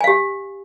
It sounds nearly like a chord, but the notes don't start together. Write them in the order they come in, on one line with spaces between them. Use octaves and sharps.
G#5 F5 G4